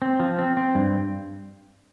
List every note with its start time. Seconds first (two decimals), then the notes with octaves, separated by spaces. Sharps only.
0.02 C4
0.20 F3
0.38 C4
0.57 C4
0.75 G2